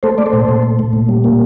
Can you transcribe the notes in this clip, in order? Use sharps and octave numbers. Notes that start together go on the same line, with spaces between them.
A3 A4 C5
A3 D5
A4 C5
A#2
A#2
A3
A3
A#2
G3
A#3